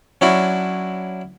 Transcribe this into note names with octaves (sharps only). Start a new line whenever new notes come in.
F#3 C#4 D4 E4 F#4